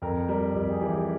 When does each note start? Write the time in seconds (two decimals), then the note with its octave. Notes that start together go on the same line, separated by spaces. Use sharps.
0.02 F2 A#4
0.28 G3 A#4
0.54 F2 G4
0.70 G#4
0.80 E3 G4